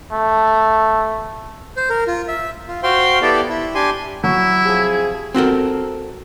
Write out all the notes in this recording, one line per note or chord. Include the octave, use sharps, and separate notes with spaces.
A3
C5
A#4
F4
E5
F4
F#4 C5 F5 G5 C6
B3 E4 G4 A4 D5
E4
D4 G4 G#5 C6
F#3 E4
C3 F3 G#4
C4 F#4 A4 A#4